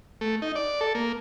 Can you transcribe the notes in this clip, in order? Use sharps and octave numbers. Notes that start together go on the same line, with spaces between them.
A3
D#4
D5
A4
A#3